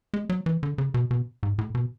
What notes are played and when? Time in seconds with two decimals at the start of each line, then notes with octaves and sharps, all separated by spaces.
0.14 G#3
0.29 F#3
0.46 E3
0.63 D3
0.78 C#3
0.94 B2
1.11 B2
1.43 G#2
1.58 A2
1.75 B2